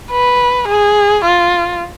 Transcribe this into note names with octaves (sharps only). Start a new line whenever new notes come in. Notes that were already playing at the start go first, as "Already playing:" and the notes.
B4
G#4
F4